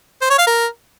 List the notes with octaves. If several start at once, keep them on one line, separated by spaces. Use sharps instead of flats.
C5
C#5
F5
A#4